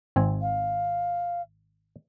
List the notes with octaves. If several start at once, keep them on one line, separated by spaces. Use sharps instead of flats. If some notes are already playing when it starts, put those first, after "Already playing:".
G#1 C4 G#5
F5